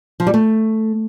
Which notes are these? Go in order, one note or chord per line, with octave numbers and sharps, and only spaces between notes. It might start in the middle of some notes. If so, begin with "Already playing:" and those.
F3
G3
A3